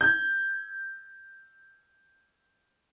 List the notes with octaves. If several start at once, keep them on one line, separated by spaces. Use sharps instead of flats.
G6 G#6